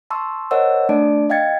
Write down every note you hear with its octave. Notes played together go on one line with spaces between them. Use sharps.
A5 C6 C#6 E6
A#4 C5 C#5 D#5 F#5 E6
A3 D4 D5 A5 D7
D#5 F5 G5 G#6 A6 C#7